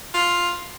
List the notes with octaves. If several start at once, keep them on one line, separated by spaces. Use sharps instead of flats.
F4